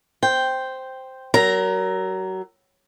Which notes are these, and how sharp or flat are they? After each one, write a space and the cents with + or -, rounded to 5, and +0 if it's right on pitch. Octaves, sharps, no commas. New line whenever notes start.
C5 +0 G5 +0
F#3 +30 A#4 +0 A#5 +0